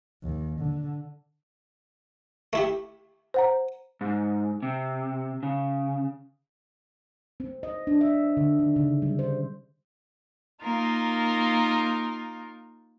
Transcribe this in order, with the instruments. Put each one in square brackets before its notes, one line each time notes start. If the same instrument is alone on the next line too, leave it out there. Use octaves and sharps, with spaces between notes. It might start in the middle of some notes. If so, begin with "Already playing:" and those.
[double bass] D#2
D3
[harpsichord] A3 E4 G4
[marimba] C5 F#5 A#5
[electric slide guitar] G#2
C3
C#3
[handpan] C4
D#5
D4
E5
D3
D#3
C#3
G3
C5
[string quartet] A#3 D#4 F4 A#4